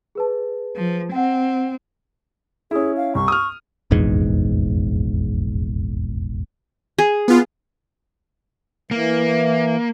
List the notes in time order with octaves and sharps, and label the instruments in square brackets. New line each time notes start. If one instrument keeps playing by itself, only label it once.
[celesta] G#4 B4 A5
[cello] F3
[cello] C4 [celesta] F#5 G5
[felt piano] C#4 E4 [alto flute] G#4
[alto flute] F5
[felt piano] C2 [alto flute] C#6
[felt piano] D#6 F6
[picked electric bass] F1 A#1 E2 G#2
[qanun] G#4
[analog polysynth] B3 F4
[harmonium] E3 [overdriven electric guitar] A#3